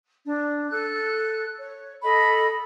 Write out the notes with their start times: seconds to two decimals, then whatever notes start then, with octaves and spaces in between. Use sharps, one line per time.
0.24 D4
0.69 A4 F#6
1.57 C#5
2.02 A4 D#5 B5